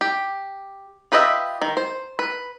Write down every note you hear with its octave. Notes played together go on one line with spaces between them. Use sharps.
G4
F4 G4 B4 D#5 E5
D#3
C5
B4